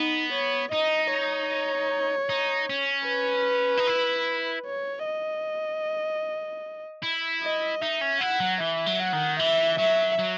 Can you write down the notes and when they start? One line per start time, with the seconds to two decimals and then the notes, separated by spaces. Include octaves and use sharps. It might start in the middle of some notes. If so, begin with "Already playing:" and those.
Already playing: B3 D#4
0.33 C#5
0.72 D#4 D#5
1.12 C#5
2.29 D#4
2.70 C#4
3.08 B4
3.77 D#4
3.87 E4
4.66 C#5
5.06 D#5
7.03 E4
7.43 D#5
7.81 D#4 E5
8.01 C#4
8.21 E4 F#5
8.40 F#3
8.60 E3 E5
8.86 F#3
9.00 F#5
9.13 D#3
9.39 E3 E5
9.79 F#3 E5
10.19 F#3